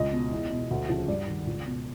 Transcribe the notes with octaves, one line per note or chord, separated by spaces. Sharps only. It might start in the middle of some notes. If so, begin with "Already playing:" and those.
Already playing: C#2 D#5
B2
E2
B2
D2
C#3 F3
G2 D5
D#3
C#2
B2